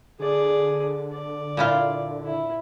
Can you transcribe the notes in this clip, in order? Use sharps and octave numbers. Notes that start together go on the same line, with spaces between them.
D3 G#4 D5
D5
A#2 E4 F4
E4